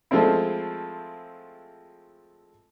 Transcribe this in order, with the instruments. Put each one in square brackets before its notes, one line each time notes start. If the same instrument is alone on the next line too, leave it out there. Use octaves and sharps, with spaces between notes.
[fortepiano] F3 G#3 A3 C4 E4